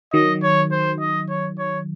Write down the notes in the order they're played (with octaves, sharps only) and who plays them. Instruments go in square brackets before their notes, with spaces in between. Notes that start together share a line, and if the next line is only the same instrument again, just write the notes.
[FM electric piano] D#3 F#3 [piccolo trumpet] D#5
[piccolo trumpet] C#5
C5
D#5
C#5
C#5